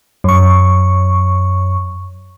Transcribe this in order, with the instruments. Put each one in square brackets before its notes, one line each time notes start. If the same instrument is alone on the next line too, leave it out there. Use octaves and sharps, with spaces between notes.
[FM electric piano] F#2 C#6